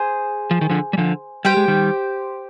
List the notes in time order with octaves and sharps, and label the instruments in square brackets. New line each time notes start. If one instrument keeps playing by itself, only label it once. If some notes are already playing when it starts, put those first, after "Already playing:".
Already playing: [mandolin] G#4 C5 G#5
[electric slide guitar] F3
D#3
D3 F3
G3
D3 F3
[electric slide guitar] G3 [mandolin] G4 C5 G5
[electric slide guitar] G#3
D#3 G3